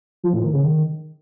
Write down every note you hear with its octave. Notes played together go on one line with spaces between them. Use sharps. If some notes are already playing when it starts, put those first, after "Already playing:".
F3
A2
D#3
C#3
D#3